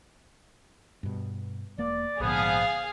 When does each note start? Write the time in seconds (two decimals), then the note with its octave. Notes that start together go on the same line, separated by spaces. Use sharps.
1.03 G2 B2
1.78 E1 A#3 D5
2.20 A#1 G#2 D3 F3 B3 G#4 F5